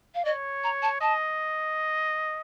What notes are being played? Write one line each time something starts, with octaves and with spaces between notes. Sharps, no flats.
F5
C#5 D#5
A#5
A5
D#5 A5